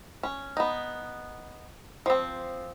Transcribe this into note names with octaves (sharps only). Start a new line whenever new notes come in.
C#4
B3 D#4
F3 C4